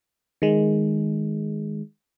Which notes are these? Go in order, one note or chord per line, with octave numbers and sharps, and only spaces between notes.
D#3 G#3